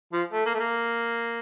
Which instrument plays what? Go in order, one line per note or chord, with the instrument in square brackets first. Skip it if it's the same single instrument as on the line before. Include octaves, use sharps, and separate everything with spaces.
[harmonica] F3
A3
A#3
A3
A#3